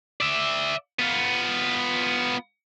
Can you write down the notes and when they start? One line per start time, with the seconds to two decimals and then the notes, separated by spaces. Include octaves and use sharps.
0.21 D5 E5
0.99 B3 F4